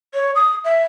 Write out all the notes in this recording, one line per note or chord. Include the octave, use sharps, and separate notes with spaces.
C#5
D#6
E5